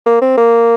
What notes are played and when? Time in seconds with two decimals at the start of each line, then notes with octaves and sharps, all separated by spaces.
0.06 A#3
0.22 C4
0.38 A#3